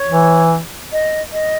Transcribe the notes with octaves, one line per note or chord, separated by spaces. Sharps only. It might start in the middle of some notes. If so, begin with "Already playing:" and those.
Already playing: C#5
E3
D#5
D#5